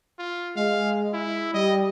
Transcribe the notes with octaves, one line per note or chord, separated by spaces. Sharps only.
F4
G#3 G#4 F5
E4
G3 D#5